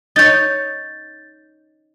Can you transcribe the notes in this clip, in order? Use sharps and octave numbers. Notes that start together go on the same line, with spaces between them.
D#4 C#5 G6 A6